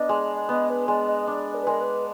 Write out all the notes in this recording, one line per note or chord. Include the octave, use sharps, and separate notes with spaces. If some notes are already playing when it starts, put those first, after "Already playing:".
Already playing: B3 D4 D#5
G#3
B3 D#5
B4
G#3 D5
D#5
D4 D5
A#4
B4
G#3 A#4
B4